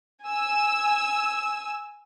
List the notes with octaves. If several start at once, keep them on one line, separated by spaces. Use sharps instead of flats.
G#5 E6